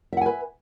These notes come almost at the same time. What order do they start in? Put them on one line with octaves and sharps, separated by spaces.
E5 F#5 G#5 B4